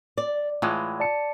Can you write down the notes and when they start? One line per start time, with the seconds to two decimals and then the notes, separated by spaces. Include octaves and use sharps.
0.18 D5
0.62 A2 E3 G#3 F4
1.00 D5 A5 C#7